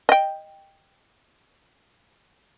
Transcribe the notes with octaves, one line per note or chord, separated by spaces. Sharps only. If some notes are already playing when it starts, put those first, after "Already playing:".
D#5 G5